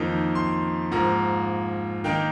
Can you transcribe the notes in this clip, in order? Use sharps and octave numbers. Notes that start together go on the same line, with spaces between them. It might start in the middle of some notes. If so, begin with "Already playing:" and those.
Already playing: F2 D#3 A#3 D#4 A#5
C6
G#2 F3 A#3 A#5
D#3 A#3 D#4 G5